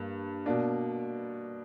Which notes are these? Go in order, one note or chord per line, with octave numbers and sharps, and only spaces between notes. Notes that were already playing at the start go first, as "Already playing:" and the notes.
Already playing: G2 A#3
B2 A#3 D4